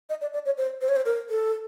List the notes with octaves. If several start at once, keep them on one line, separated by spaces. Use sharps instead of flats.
D#5
D5
D5
C#5
C5
C5
C#5
C5
A#4
A4